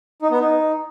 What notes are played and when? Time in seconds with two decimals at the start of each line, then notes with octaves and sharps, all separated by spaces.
0.22 D#4
0.31 B3
0.40 D#4